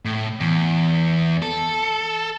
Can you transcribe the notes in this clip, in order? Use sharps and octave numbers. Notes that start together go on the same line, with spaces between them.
A2
E2
A4